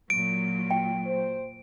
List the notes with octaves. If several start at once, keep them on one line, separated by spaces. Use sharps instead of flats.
A#2 F#3 D7
G5
C5